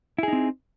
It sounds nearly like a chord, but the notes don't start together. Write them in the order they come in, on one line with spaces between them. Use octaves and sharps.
E4 G#4 D#4 C4